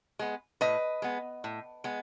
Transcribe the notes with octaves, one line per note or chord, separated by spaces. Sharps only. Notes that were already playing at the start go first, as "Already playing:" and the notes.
G#3 B3
A2 B4 D#5
G#3 B3
A2
G#3 B3